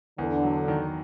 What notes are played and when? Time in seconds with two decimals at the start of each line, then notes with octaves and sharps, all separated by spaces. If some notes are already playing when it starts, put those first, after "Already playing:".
0.18 E2 D3
0.43 F#3
0.68 D#3